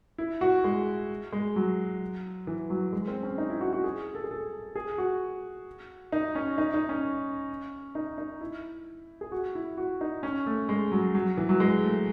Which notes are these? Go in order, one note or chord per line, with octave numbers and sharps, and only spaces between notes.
E4
F#4
G#3
G#3
F#3
E3
F#3
G#3
C4
C#4
D#4
E4
F#4
F#4
G#4
A4
G#4
A4
G#4
F#4
D#4
C#4
D#4
D#4
C#4
D#4
D#4
E4
G#4
F#4
E4
F#4
D#4
C#4
A3
G#3
F#3
F#3
E3
F#3
G#3
A3